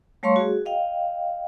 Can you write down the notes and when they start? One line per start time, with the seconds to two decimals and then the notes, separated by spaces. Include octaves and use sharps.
0.23 G3 A3 C#5 F5 C6 C#6
0.36 F#4 G#4
0.66 D#5 F5 G5